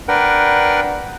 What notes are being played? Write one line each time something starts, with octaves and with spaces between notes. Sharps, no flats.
D4 A#4 B4 F#5 G5